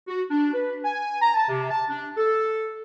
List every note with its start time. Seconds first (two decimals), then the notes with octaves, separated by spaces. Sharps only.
0.08 F#4
0.31 D4
0.53 B4
0.84 G#5
1.21 A#5
1.35 A5
1.49 C3
1.70 A5
1.89 D4
2.17 A4